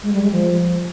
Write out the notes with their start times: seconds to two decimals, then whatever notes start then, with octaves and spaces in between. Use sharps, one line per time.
0.03 G#3
0.13 G3
0.23 G#3
0.32 F3